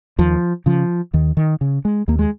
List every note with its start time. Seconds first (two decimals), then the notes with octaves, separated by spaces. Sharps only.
0.18 D#2 F3
0.66 C#3 F3
1.13 D#2 D#3
1.37 D#3
1.61 C#3
1.85 G#3
2.08 D#2 A#3
2.19 G#3